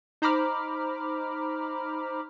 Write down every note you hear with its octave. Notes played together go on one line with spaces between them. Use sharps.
D#4 C5 A#5 B5 D6 F6